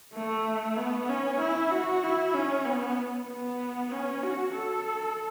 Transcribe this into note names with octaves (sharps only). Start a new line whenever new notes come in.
A3
B3
C#4
E4
F#4
E4
C#4
B3
B3
C#4
F#4
A4